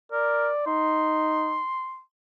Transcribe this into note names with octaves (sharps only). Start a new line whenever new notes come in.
A#4 D5
D#4 C6